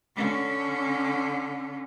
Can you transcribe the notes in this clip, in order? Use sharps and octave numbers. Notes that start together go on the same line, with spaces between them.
D3 C#4